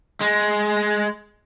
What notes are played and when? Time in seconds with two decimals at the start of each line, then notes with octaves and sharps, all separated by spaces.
0.21 G#3